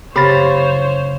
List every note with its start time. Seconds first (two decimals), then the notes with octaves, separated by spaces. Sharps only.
0.16 F#1 C#3 G4 C5 C#5 F5 B5 A6